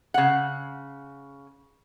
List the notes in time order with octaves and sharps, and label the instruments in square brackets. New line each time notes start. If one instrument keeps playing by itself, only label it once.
[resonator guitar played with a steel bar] C#3 F#5